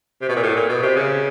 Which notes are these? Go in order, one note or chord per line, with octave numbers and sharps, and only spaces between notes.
C3
B2
A#2
A2
A#2
B2
C3
C#3